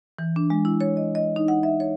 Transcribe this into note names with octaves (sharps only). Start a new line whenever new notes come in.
E3
D4
G#3
E4
C#5
D#5
D#5
D#4
F#5
E5
C#5